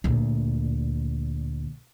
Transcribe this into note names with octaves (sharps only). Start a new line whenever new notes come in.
D2 A#2